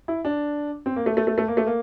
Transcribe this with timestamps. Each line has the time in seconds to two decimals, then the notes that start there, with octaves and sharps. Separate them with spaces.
0.08 E4
0.25 D4
0.86 C4
0.96 A#3
1.06 A3
1.17 A3
1.27 A3
1.38 A3
1.48 A#3
1.57 A3
1.67 A#3